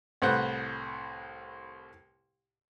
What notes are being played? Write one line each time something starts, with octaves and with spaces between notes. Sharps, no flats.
C2 A2 B4 C5 F#5